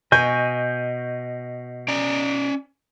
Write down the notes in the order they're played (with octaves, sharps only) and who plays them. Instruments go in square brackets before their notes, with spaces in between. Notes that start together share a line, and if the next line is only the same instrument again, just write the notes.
[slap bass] B2 [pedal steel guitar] D#5 G#5 C#6 [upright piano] G6
[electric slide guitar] C#4 D5 A#5